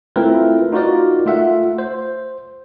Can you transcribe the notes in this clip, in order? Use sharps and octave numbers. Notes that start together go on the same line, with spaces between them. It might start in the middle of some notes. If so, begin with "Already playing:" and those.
A3 C4 E4 F4 A#4 B4
D#4 F4 F#4 A#4 D5
A3 F4 E5 F#5
C5